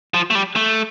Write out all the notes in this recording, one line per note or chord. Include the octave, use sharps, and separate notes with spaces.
F3
A3
G3
A3